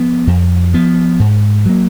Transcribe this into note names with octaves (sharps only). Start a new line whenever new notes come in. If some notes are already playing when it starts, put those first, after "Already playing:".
Already playing: F3 B3
F2
F3 B3
G#2
F#3 A#3